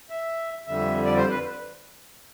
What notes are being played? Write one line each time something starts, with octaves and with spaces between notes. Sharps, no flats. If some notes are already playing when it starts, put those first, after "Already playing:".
E5
F2 D3 G3 E5
D5
C5
B4